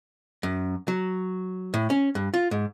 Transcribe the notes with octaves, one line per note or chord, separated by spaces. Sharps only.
F#2
F#3
A2
C#4
G2
F4
G#2